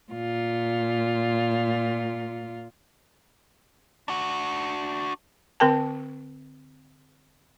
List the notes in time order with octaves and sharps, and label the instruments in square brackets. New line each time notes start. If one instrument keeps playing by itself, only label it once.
[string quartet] A#2 F4
[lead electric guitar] D4 F#4
[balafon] D3 C4 A#4 G5 A5